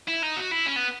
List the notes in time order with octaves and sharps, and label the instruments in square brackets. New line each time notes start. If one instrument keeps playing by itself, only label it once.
[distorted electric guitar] E4
D#4
F#4
E4
C#4
B3